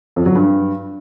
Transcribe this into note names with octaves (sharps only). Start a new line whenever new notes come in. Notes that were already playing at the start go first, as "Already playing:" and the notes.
F2
F#3
G2